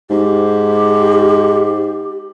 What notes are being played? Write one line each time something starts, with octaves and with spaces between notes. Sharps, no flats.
G#2 G4